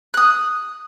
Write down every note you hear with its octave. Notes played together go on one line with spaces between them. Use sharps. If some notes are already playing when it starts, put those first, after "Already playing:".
D#6 F#6